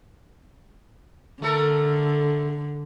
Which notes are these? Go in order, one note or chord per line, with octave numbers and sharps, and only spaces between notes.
D3 A3 A4 A#4